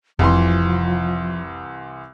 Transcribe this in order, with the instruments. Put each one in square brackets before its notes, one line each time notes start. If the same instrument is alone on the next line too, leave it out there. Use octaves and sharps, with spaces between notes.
[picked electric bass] F1 [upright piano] C2 E3 C6 [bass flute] F3